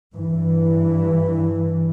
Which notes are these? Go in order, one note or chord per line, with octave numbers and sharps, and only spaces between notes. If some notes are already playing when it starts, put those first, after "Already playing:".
G2 E3